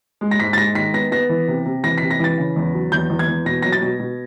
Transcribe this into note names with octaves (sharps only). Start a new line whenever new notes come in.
G#3
A#6
G#2 B6
A6
G#3 A#6
D#3 B6
B3 A#6
B3 A#6
E3
C3
C3
E3 A#6
C3 B6
A#6
E3 A6
C#3
E2
F#3
E2 G6
E2
G#6
E2
B2 A#6
F#3 A#6
A6
B2
B2